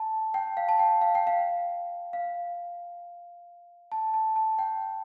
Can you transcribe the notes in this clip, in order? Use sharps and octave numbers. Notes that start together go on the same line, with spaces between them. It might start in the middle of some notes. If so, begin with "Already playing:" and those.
Already playing: A5
G5
F5
A5
G5
F5
G5
F5
F5
A5
A5
A5
G5